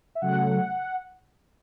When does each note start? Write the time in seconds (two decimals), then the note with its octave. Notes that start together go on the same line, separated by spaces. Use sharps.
0.15 E5
0.22 C#3 F#3 A3 F#5